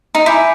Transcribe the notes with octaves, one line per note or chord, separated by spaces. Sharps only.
D#4
E4 G#5 B5 D6 G6 B6